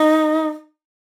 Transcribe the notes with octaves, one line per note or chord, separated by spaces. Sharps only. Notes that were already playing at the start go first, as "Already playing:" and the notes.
Already playing: D#4